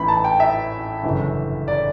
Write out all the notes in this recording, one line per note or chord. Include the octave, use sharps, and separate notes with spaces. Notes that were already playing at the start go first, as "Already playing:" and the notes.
Already playing: A1 A2 E3 B5
A5
G5
E5
G1 F#2 C#3 E3
D5